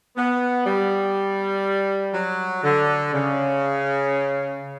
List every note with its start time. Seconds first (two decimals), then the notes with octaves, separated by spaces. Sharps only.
0.16 B3
0.66 G3
2.14 F#3
2.64 D3
3.13 C#3